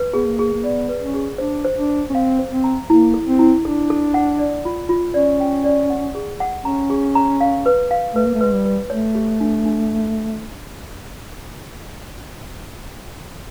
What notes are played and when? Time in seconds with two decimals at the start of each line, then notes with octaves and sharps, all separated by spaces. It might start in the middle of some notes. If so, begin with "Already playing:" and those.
Already playing: B4
0.14 B3 G#4
0.26 A#3
0.39 G#4
0.54 A#3
0.64 B3 D5
0.89 B4
1.01 C#4
1.14 G#4
1.38 D4 C5
1.65 C5
1.77 D4
1.90 C5
2.10 C#4
2.14 C4 F5
2.39 C5
2.51 C4
2.64 A#5
2.89 A#3 E4
3.14 A4
3.27 C4
3.39 E4
3.64 D4 A4
3.90 A4
4.14 F#5
4.39 D5
4.65 F4
4.89 F4
5.14 C#4 D5
5.40 G5
5.64 D5
5.90 F#5
6.15 G#4
6.40 F#5
6.65 C#4 A#5
6.90 G#4
7.15 A#5
7.41 F5
7.66 B4
7.91 F5
8.15 A3 B4
8.26 A#3
8.35 A3
8.41 G#3 B4
8.53 G3
8.65 B4
8.90 A3 C#5
9.15 G4
9.40 D4
9.66 D4